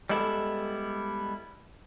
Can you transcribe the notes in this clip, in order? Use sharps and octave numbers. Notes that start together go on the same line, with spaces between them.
G3 G#3 B3 E4 G4 A4